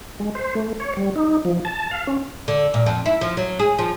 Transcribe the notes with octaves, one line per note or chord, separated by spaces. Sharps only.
G#3
C5
A3
C#5
G3
D#4
F3
A5
F5
C#4
D3
A#2
F2
E4
F3
F#3
G#4
F3